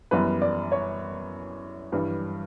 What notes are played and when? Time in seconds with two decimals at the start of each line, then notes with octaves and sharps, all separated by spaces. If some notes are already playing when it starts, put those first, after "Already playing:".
0.11 F#2 E3 G3 B3 B4
0.42 D5
0.72 C#5
1.92 G2 E3 G3